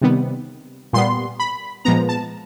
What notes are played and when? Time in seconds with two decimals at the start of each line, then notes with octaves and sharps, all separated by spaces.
0.01 C3 D#3 G3 B3
0.93 A#2 G3 B3 C6
1.40 B5
1.85 A#2 F3 G#3 B3 A#5
2.09 A5